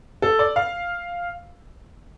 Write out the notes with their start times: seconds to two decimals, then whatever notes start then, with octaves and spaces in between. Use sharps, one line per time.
0.22 A4
0.39 D5
0.56 F5